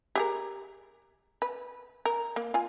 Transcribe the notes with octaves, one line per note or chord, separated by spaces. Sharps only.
G4 G#4 A#4
B4
A#4
A#3
F4 G#5